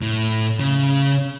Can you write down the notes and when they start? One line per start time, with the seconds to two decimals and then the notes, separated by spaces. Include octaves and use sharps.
0.02 A2
0.60 C#3